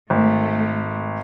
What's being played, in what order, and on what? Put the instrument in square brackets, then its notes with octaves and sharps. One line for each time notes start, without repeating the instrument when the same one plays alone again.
[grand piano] G#1 [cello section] A3